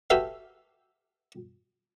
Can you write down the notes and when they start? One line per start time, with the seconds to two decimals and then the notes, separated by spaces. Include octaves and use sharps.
0.10 F#4 G4 A4 B4 E5 F5